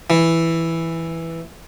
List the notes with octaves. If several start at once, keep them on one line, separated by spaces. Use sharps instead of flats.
E3